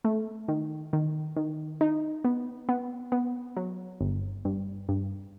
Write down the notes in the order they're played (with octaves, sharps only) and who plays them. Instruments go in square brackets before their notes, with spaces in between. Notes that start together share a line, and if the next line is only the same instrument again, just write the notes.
[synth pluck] A3
D#3
D#3
D#3
D#4
B3
B3
B3
F#3
G1
G2
G2